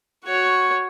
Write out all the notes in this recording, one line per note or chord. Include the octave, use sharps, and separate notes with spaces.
F#4 C#5